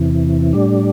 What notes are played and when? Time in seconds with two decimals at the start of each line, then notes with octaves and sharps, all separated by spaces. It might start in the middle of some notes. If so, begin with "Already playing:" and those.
Already playing: E2 C3 E3
0.53 A2 G3 D4